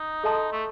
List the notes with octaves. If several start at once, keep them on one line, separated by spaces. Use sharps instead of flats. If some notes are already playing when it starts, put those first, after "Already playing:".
Already playing: D#4
A4 D#5 A5 C6
A3